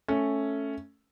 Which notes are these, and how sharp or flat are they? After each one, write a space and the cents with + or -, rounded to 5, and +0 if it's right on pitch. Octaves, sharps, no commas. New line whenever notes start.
A3 +0 C#4 +0